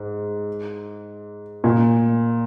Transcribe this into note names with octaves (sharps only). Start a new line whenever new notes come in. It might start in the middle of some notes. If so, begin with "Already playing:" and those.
Already playing: G#2
A#2